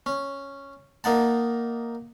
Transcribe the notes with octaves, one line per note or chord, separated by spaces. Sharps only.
C#4
A#3 D#4 F#5 A5